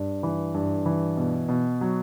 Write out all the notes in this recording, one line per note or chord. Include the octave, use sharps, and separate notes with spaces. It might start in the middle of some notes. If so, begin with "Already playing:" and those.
Already playing: G2
E3
G2
E3
B2
B2
F#3